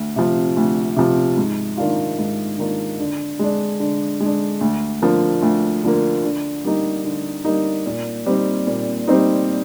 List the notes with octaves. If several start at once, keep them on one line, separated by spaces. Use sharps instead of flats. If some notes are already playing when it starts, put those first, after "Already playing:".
Already playing: D2
C3 F3
D2
C3 F3
G#2
D#3 A#3 D4 F4
G#2
D#3 A#3 D4 F4
D3
G#3 D4
D3
G#3
D4
D2
D3 F3 A#3
D2
D3 F3 A#3
D3
G3 A#3 D#4
D3
G3 A#3 D#4
A#2
G3 C4 D#4
A#2
G3 C4 D#4